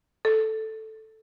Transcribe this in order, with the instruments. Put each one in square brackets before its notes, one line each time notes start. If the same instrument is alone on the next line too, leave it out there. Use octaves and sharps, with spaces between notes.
[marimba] A4